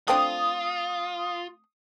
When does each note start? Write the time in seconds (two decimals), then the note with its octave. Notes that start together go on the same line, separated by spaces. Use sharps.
0.08 A3 C4 D4 F4 D#6